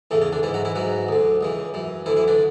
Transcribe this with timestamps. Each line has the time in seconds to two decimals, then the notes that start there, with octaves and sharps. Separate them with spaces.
0.11 E2 A2 C#3 E3 A3
0.22 C#3 C#4
0.33 D3 D4
0.43 G#2 E3 E4
0.54 F#3 F#4
0.65 E3 E4
0.75 G#2 E3 F#3 F#4
1.09 D2 D3
1.41 C#2 C#3 E3
1.74 F#2 E3
2.06 D2 D3 E3 E4
2.17 E3 E4
2.28 D3 D4